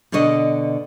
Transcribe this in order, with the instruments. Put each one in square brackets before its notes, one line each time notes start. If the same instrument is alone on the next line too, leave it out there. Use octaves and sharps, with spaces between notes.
[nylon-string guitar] B2 D3 D4 C#5 D#5